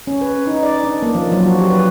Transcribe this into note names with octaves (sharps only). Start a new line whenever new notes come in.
C#4
B4
D#4
D5
D4
A#3
F3
F#3
F#4
G4
B4